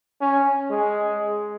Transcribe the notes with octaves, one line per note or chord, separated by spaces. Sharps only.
C#4
G#3